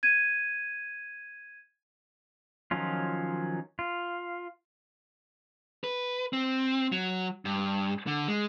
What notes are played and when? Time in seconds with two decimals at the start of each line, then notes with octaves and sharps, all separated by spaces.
0.03 G#6 D#7
2.71 D#3 F3 F#3 C#4 F4
3.79 F4
5.84 B4
6.33 C4
6.92 F#3
7.45 G2
8.07 D3
8.28 G#3